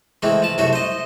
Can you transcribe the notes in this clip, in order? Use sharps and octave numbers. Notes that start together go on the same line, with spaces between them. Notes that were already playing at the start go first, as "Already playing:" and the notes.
E3 G#3 A3 C4
F3 A5
C2 F#2 A3 F#4 C5
C5 D#5